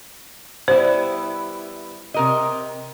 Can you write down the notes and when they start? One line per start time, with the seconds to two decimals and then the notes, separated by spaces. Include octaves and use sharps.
0.68 G3 B3 E4 C5
2.14 C3 A#4 D#5